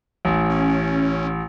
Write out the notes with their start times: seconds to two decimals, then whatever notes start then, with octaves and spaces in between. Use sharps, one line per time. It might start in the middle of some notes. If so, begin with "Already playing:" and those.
0.25 A1
0.50 C#4